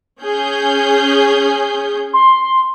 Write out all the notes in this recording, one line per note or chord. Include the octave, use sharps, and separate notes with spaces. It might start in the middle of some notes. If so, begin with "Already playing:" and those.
C#4 G#4 G6
C6